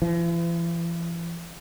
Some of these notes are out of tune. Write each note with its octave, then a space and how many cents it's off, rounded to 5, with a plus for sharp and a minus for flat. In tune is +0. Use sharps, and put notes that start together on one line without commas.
E3 +45